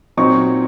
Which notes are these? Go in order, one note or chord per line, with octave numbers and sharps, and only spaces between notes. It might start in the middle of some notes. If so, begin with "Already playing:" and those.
A#2 F#3 C4 D#4 C#6